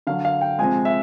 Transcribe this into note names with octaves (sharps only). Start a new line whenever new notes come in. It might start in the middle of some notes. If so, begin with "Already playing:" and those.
D3 F#3 F5
F5
G5
C3 F3 G#3 G#5
E5